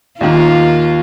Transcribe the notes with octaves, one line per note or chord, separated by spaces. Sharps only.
D#2 D#3 A#3 F4